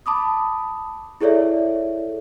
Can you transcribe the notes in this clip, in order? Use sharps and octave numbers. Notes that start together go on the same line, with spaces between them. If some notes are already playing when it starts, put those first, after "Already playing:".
A5 B5 D6 D#6
E4 G#4 A4 C#5 D5 E5